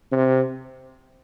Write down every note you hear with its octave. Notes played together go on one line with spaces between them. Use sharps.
C3